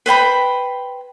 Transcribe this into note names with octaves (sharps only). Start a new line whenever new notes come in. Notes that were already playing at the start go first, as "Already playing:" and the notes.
B4 C5 G5 B5